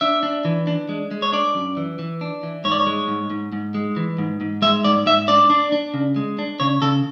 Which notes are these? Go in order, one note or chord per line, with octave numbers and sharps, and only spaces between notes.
D4 E5
D4
E3
D4
G#3
G#3
C#5
D4 D5
F#2
E3
E3
D4
E3
G#2 C#5
D5
C#5
G#3
G#2
G#2
G#2
G#3
E3
G#2
G#2
G#3 E5
G#2 D5
G#2 E5
D4 D5
D4
D4
C#3
G#3
D4
C#3 C#5
C#3 A4